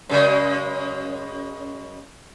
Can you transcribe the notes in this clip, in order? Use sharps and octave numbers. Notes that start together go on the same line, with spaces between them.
F#2 C#3 G#3